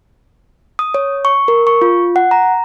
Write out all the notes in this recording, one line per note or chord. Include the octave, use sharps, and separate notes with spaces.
D#6
C#5
C#6
A#4
C#6
F4
F#5
A#5